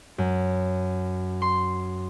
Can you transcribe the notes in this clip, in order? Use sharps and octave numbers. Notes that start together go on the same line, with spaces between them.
F#2
C6